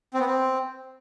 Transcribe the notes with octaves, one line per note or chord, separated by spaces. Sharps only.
C4
B3
C4